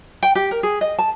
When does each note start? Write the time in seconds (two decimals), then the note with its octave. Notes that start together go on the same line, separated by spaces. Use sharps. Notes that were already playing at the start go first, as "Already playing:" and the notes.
0.23 G5
0.35 G4
0.51 A#4
0.63 G#4
0.81 D#5
0.99 A5